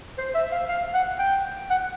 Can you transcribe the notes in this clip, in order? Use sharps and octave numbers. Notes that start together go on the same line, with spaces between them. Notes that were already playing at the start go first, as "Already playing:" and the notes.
C5
E5
F5
F5
F#5
G5
F#5